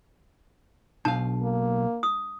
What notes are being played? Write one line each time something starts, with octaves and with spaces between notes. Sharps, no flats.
B1 D4 F5 A5
A#3
D#6